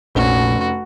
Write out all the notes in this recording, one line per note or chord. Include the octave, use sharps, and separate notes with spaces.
F1 A#1 C#4 F#4